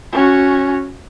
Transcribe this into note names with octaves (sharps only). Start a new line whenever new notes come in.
C#4 F#4